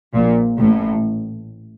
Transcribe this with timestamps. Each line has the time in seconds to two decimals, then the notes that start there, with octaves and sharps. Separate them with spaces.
0.14 A#1 A#2
0.59 A1 A2